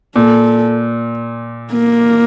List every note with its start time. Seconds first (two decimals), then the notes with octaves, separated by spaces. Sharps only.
0.16 A#2 A4
1.73 A#3